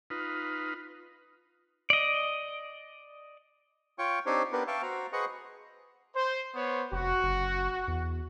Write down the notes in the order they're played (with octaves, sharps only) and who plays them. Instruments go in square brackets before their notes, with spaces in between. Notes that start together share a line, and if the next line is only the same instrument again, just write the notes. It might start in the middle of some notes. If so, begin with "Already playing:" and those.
[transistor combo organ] D#4 F4 B4
[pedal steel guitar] D5 D#5
[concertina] F4 C#5 G5 C#6
C4 D4 D#4 G4 C5 C#5
B3 D4 G4 A#4 B4
E5 F5 G5 A5 C#6
F#4 C5 A#5
G#4 B4 C5 D#5 F#5 C#6
[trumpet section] C5
B3 C5 C#5
[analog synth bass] F1 [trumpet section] F#4
[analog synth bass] F#1
E2